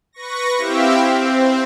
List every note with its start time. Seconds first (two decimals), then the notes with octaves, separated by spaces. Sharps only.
0.13 B4 C#6 A#6
0.57 C4 E4 G4 E5 F5 G5
1.00 C4